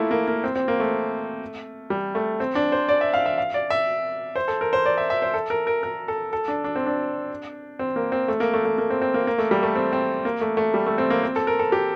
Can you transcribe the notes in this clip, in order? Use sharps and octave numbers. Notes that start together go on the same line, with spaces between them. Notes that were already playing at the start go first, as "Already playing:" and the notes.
Already playing: A3 A#3 E4 F4
A#3
A#3
C4
C4
A#3
A3
G3
A3
C4
D4
C5
D5
E5
F5
E5
F5
D5
E5
C5
A4
A#4
C5
D5
E5
E5
C5
A4
A#4
A#4
A#4
A4
A4
D4
D4
C4
D4
C4
A#3
C4
A3
A#3
A3
A3
A#3
C4
C4
A#3
A#3
A3
G3
A3
C4
C4
A#3
A3
A3
G3
A3
C4
A#3
C4
A4
A#4
A4
G4